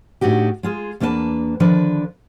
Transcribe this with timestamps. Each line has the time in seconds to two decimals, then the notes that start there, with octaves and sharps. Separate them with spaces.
0.21 A2 D4 D#4 F#4 G4
0.63 G#3 F4 G#4
1.00 E2 A#3 D4 E4 B4 A5
1.60 D3 D#3 F3 D4 B4